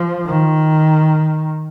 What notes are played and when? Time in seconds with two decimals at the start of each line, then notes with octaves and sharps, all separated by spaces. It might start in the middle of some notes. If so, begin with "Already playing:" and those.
Already playing: F3
0.26 D#3